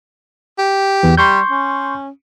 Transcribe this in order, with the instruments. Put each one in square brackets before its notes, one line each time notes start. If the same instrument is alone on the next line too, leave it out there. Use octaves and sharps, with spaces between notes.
[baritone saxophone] G4
[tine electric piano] E2 E3
[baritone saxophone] G3 [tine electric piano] C6 C#6 G6
[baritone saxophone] C#4